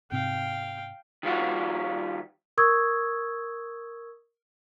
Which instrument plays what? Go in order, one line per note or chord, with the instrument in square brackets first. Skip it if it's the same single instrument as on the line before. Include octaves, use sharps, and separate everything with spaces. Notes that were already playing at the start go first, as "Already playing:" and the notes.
[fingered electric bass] G#2 C3 C4 [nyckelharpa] F5 G5
[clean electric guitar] D#3 G3 F4 F#4
[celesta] A#4 C#6 D#6 E6 G#6